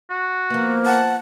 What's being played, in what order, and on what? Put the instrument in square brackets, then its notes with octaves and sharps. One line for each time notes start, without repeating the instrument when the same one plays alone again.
[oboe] F#4
[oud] F3 B3 [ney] A#3
[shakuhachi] F#5 [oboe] A5